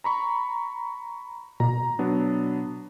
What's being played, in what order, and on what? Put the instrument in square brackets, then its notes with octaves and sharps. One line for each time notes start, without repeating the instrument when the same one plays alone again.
[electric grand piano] A#5 B5 C#6
[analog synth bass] B2 [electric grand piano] A#5
[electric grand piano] F#3 B3 D4